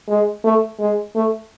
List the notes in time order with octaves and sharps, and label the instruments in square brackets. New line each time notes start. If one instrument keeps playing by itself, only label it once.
[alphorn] G#3
A3
G#3
A3